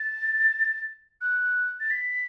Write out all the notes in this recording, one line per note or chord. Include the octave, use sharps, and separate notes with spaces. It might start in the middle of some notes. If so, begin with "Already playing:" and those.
Already playing: A6
F#6
A6
B6